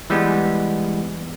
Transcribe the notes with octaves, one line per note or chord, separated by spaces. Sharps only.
E3 G3 G#3 B3